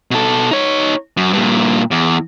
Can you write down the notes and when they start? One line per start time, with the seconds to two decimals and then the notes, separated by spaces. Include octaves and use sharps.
0.11 B2 A4
0.51 D#4 C#5
1.17 F#2
1.33 G2 A#2
1.91 E2